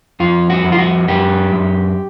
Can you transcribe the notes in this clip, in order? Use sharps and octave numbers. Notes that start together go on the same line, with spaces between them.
F2 F4
F#4
F2
F4
F#4
F#2 G4
F#2